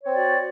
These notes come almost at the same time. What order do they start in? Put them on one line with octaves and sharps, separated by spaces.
C#5 C4 D5 F#4